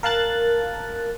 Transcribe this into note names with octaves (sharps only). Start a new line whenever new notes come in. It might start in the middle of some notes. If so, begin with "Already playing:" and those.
A#4 F5 A5 F#6 A6